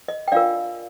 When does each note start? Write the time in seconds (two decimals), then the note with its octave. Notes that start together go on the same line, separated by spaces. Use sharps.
0.08 D#5
0.28 G5
0.32 D4 F4 A#4 D5 F5